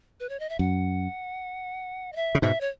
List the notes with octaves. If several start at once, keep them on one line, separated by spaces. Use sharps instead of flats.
B4
C#5
D#5
E5
F#2 F#5
D#5
E5
C#3
G#2 B2 E5
C#5